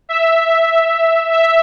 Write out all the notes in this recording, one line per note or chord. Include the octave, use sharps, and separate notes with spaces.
E5
E5